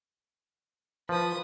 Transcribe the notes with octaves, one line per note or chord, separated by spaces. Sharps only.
F3 B4 D#6